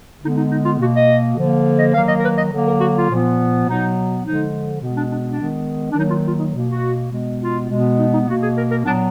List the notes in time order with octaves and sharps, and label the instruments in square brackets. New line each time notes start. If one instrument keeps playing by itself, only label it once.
[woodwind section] D3 G#3 B3 D#4
D#4
D#4
F4
B2 A#3 F#4
D#5
D3 F3 A#3
D#5
D#3 F#3 A#3 F5
D#5
A#4
B4
D#5
D3 F#3 A#3
A#4
F#4
F4
A#2 F3 B3
B2 F#3 B3 D#4
D3 F3 G#3 D#4
B2 G#3 B3
D4
D4
D4
D#3 G#3 B3
D4
D#3 F#3 A#3 D#4
F4
F4
D#4
B2 A#3
F#4
B2 G#3 B3
F4
B2 G#3 B3
D#4
D#4
B2 A#3 F#4
G#4
A#4
A#4
A#2 F#3 B3 D4